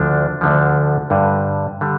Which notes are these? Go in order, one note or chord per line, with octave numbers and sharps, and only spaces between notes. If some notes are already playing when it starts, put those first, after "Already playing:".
Already playing: D2 D3 F3 D4
D2 D3 F3
G2 D3 G3
D3 G3